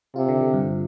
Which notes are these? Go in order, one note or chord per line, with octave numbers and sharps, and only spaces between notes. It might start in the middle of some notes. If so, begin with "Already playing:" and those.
C3 F4
D3
D3
G2